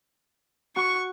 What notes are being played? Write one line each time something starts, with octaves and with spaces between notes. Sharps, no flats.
F#4 C#6